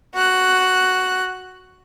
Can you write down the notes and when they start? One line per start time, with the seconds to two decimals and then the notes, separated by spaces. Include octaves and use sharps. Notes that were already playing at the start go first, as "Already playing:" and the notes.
0.15 F#4 F#6